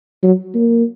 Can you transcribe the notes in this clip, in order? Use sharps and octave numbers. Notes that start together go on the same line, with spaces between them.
F#3
A#3